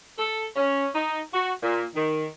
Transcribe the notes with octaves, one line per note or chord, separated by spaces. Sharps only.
A4
C#4
D#4
F#4
A#2
D#3